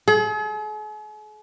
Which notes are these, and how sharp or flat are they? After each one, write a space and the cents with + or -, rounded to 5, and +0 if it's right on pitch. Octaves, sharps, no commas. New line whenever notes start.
G#4 +45